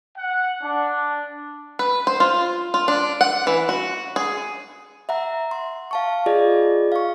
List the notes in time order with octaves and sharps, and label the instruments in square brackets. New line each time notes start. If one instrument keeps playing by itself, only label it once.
[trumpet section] F#5
D4
[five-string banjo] B4
C5
F4
F4
D4
F#5
E3
F#4
G#4
[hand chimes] E5 F#5 A#5
C6
F5 A5 C#6
F4 G#4 D5 D#5
F5 C#6